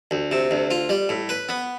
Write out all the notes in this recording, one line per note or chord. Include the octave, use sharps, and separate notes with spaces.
D2
C3
D2
F4
G3
A2
B4
B3